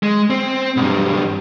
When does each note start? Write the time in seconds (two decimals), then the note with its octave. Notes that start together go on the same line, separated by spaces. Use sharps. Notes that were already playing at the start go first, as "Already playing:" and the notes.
0.03 G#3
0.30 C4
0.77 B1 G2